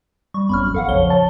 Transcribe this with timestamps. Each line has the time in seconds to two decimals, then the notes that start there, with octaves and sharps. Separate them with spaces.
0.34 G3 C#6
0.49 G#1 F2 B3 C#4 B5 C#6 F6
0.63 F#3
0.74 E2 A4 F5 F#5
0.89 A#1 F2 C#3 F3 C#5 G7
1.07 C#5 A5